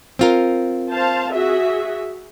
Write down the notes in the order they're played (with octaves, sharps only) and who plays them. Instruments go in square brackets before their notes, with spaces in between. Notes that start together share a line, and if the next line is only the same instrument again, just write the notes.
[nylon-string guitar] C4 F4 A#4
[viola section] C5 F5 A5
F#4 G#4 E5